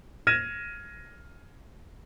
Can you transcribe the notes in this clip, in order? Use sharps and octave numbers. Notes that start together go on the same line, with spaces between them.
F6 G#6 A#6 D#7 E7